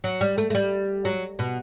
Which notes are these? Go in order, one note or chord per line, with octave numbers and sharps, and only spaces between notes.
F#3
G3
A3
A3
G3
F#3
B2